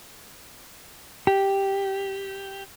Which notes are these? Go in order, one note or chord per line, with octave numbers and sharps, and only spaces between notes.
G4